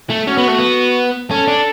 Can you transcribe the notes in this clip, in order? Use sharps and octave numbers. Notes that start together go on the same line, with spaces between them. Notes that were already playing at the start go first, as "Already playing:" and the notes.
A3
C#4 F#4
B3
A3
B3
C#4 A4
D4